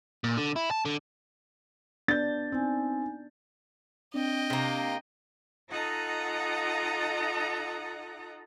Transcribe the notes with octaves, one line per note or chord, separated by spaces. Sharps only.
A#2
D3
E4
A5
D3
B3 D4 G6 A6
C4 D#4 G#5
C4 D4 D#5 G5
C3 A#3
D#4 F4 A4 D#5 F#5 A#5